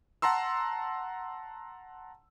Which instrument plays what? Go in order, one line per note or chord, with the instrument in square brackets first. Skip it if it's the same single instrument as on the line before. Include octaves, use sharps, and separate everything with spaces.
[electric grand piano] F#5 A5 A#5 C6 E6